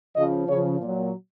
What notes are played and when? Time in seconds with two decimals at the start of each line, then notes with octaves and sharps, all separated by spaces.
0.16 C#3 F3 D#5
0.48 C#3 F3 C#5
0.80 A#2 F#3